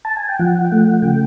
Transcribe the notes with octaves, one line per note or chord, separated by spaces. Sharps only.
A5
G#5
G5
F3 F#5
G5
A3 F#5
F#5
C#3 G5